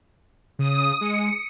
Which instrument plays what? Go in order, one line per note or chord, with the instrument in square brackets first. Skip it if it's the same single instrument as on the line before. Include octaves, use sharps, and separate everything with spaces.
[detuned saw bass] C#3 [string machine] D#6
[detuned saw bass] G#3 [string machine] C#7